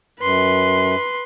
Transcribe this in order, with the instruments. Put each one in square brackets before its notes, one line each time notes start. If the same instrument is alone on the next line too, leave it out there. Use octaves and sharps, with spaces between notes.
[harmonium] F#2 [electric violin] B4 C6